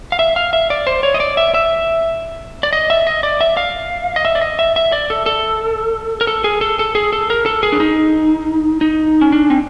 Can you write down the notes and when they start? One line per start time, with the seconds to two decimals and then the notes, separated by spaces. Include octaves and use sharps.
0.12 F5
0.19 E5
0.36 F5
0.53 E5
0.70 D5
0.87 C5
1.03 C#5
1.14 D#5
1.20 D5
1.37 E5
1.54 E5
2.63 D5
2.73 D#5
2.90 E5
3.07 D#5
3.23 D5
3.41 E5
3.57 F5
4.16 D#5
4.25 E5
4.35 D5
4.42 D#5
4.59 E5
4.76 E5
4.92 D5
5.10 A4
5.26 A4
6.21 A#4
6.27 A4
6.44 G#4
6.61 A4
6.79 A4
6.95 G#4
7.13 A4
7.30 A#4
7.46 A4
7.63 G#4
7.72 D4
7.80 D#4
8.81 D#4
9.21 C#4
9.32 D4
9.50 C4